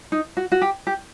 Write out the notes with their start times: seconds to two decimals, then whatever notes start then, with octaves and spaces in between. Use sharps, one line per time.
0.12 D#4
0.37 F#4
0.52 F#4
0.62 G4
0.87 G4